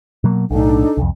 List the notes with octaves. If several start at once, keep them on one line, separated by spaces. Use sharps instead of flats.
B2 F#3 A#3
B1 A2 D4 D#4 A4
C2 F2